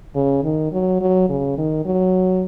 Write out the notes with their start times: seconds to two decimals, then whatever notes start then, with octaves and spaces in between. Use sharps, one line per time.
0.15 C#3
0.44 D#3
0.72 F#3
1.01 F#3
1.29 C#3
1.58 D#3
1.86 F#3